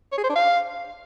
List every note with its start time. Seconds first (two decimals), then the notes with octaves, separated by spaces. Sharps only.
0.12 C#5
0.18 G#4
0.24 C5
0.29 D4
0.35 F5